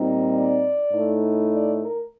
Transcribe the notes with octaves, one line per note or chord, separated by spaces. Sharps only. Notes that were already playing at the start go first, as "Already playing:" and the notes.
Already playing: A#2 G3 C4 D#4
D5
A2 A3 D#4
D5
A#4